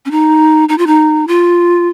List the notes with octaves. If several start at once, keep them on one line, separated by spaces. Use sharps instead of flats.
C#4
D#4
D#4
F4
D#4
F4